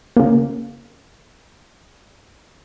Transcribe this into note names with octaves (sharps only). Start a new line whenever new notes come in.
C#3 A#3